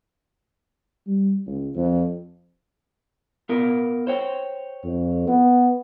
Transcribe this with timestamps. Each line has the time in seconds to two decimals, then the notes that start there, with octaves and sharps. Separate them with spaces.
1.07 G3
1.47 C#2
1.75 F2
3.49 B3 F4 A#4
4.07 C5 C#5 G5
4.84 F2
5.27 B3